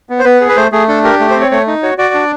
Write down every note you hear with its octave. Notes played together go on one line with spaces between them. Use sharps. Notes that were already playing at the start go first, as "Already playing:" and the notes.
B3
C5
B3 B4
G#4
B4
A3 C5
A3 G#4
D4 A4
G4 A#4
A3
C5
C4
C#5
A3 C#5
D#4
F#4 C#5
F#4 D5
D4